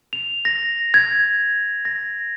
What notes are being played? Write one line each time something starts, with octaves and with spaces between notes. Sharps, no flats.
F7
A#6
G#6
A#6